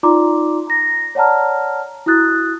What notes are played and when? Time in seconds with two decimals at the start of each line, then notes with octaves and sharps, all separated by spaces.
0.03 D#4 F4 D5 A#5 C6 D6
0.67 A#5 A#6
1.15 C#5 D5 F#5 A5 A#5 F6
2.06 E4 F#4 D#6 F#6 A6